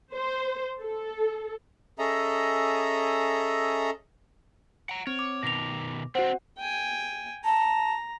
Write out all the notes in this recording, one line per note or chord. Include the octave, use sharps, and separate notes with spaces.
C5
A4
C#4 G#4 A4 D#5 E5 A#5
F#5 A#5 D7
C4 C#5
D6
B2 D#3 A#6 F7
C4 D4 F#4 C5 F#5
G5 G#5
A5 A#5